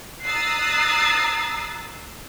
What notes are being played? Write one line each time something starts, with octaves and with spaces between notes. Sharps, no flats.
A#5 D#6 E6 F#6 A6 C7